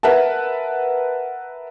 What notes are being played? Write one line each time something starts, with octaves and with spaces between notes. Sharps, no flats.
A#4 B4 E5 F#5 A5